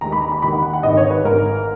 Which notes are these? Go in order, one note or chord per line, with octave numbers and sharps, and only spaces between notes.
D#2 D#3 G#3 A#5
B5
A#5
B5
D#2 D#3 G#3 B5
F#5
F#5
F#5
G#1 G#2 D#3 D#5
C#5
B4
G#1 G#2 D#3 A#4